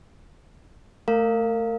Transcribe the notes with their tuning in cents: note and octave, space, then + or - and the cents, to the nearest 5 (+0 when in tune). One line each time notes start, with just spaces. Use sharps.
A3 +0 A#4 -30 F5 -5